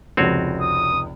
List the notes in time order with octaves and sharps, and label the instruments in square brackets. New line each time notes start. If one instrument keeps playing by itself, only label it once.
[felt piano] F1 C#2 [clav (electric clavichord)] C4 F#4 C#5
[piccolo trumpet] D#6